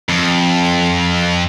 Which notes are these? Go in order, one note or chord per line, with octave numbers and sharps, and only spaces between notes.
F2